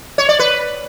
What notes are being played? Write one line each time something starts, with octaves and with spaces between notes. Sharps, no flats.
C#5
D5
B4